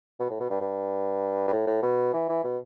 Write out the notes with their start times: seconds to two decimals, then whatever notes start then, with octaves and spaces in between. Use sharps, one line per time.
0.20 B2
0.30 A2
0.40 B2
0.50 G2
0.61 G2
1.48 G2
1.53 A2
1.67 A2
1.83 B2
2.13 E3
2.29 E3
2.44 B2